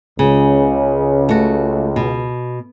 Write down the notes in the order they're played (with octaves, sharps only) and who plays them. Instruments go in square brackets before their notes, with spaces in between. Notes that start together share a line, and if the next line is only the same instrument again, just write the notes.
[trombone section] C#2 [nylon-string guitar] C#3
[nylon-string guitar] A3 F#4
B2